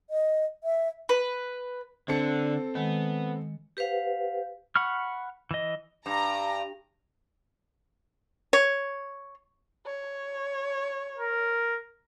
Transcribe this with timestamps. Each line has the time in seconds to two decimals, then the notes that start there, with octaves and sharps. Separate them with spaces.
0.10 D#5
0.64 E5
1.09 B4
2.08 D3 C4 A4 C#7
2.75 D#3 G#3 B3
3.77 G4 B4 C5 F5 F#5
4.76 F#5 B5 C#6 F6
5.51 E3 D#5
6.06 G2 A#5
8.53 C#5
9.86 C#5
11.18 A#4